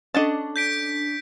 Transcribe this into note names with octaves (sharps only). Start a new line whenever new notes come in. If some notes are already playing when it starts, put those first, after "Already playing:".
C#4 D4 A4 D#5 F#5 A5
G6 B6 D7